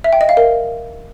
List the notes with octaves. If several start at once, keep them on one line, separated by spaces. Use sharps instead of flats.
E5
G5
D#5
F5
A#4